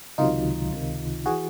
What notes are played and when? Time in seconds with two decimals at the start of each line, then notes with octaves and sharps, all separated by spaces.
0.18 C#2 C3 D#3 F#3 D#4 F4
0.72 C#2 C3 D#3
1.26 E3 F#4 G#4